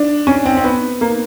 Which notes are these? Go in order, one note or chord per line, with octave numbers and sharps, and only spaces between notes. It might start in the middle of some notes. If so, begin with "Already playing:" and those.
Already playing: D4
C#4
C4
C4
B3
A#3